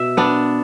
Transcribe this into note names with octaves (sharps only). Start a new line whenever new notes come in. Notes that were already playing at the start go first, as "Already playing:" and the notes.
Already playing: B2 E5
B3 D4